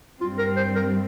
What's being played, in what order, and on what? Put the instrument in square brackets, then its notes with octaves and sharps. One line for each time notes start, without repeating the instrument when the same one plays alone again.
[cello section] G2 G3 C4 [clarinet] F4
[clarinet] A#4
C5
A#4